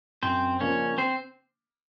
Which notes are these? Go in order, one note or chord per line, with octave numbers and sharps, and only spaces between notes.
F#2 C4 C5
C#3 F3 A#3 C#4 D4 C#5
C4 C5